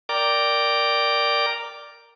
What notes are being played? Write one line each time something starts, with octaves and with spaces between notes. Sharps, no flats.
A#4 D5 G5 A#5 D6